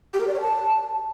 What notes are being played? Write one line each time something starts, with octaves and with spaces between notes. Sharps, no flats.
G4
A#4
D5
C#5
A5